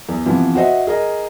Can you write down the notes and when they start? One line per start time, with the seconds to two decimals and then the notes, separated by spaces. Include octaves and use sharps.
0.08 E2
0.25 C3 E3 F3 B3
0.55 F#4 C5 D#5 E5
0.87 G#4 A#4 D#5